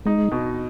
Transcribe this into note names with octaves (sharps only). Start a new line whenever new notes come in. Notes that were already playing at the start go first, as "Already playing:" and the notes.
G#3 D#4
B2